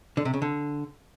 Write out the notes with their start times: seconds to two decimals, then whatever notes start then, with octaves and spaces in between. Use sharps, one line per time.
0.17 D3
0.25 C3
0.34 C#3
0.42 D3